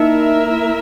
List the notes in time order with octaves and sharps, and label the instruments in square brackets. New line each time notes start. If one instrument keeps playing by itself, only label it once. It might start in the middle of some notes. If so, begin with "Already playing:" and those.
Already playing: [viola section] A#3 E4 A#4 E5 [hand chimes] D#4